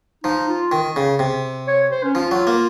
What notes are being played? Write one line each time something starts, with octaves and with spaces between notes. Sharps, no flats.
F3 D#4
F4
D#3
C#3
C3
C#5
C5
C#4
F3 F4
F#3
A#3